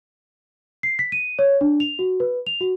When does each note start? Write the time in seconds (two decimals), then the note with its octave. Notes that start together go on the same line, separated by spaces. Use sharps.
0.83 C7
0.99 B6
1.12 D#7
1.39 C#5
1.61 D4
1.80 F7
1.99 F#4
2.20 B4
2.47 F7
2.61 F#4